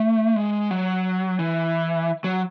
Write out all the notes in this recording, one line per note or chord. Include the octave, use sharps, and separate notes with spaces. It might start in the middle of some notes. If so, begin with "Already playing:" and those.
Already playing: A3
G#3
F#3
E3
F#3